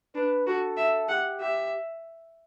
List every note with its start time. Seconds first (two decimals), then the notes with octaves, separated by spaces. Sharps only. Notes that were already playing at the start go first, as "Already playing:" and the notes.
0.15 D4 B4
0.47 F#4 A4
0.77 E5
1.09 G4 F#5
1.40 G4 E5